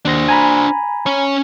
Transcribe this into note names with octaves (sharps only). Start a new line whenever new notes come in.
D#2 D4 C5 A#6
G#5 A#5 B5
C#4 C#5